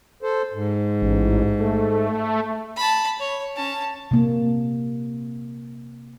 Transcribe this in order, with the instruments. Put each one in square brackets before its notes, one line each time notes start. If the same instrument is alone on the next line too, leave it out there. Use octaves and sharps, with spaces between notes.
[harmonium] A4 C5
G#2
[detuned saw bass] A1
A3
[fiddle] A5 B5
C#5
C#4 A5
[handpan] C3 A#3